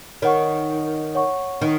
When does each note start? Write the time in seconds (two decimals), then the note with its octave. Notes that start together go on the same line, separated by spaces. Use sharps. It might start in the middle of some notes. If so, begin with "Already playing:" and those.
0.22 D#3 C#5 F#5 C#6
1.15 C#5 F#5 C#6
1.61 D#3